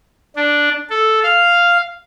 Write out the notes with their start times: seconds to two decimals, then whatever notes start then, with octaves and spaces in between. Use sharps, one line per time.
0.36 D4
0.90 A4
1.23 F5